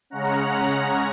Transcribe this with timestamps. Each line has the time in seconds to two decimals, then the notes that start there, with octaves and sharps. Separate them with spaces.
0.10 C#3 G#3 C#4 F#5 A#5
0.75 A#5 C#6